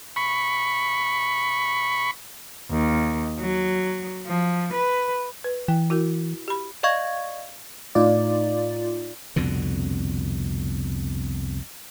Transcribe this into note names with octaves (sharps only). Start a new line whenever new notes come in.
B5 C#6
D#2
F#3
F3
B4
B4
E3 G5
E4 F#4 A#4
G4 B5
D5 D#5 F5 C#6 G#6
A2 D#4 F4 D5
C2 F2 B2 D3